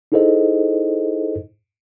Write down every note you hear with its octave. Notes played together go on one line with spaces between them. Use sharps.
D#4 E4 G#4 A4 C5 D#5